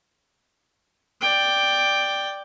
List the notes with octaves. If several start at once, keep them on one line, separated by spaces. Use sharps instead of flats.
D5 G5